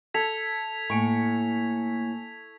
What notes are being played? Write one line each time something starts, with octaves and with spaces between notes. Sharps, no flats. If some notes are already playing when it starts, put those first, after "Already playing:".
A4 G#6 B6 F7
A2 A#3 G#5 C#6